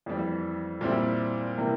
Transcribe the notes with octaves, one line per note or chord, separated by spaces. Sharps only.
F2 E3 G3
A#2 G3 C4 E4
C3 E3 G3 A#3